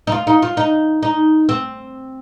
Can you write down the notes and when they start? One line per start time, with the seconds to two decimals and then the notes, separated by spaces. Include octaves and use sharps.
0.07 D#4
0.12 F4
0.27 D#4
0.42 F4
0.57 D#4
1.03 D#4
1.49 C4